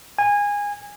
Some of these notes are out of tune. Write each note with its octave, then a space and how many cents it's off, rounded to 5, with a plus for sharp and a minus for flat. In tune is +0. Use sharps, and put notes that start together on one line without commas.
G#5 -20